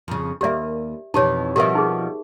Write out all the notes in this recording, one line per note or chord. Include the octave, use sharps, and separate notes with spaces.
F2 C#3
D#2 A#3 G4 D5 E5
F2 B2 E3 D#4 G4 C#5
B2 F3 G4 A#4 E5
D#4 G#4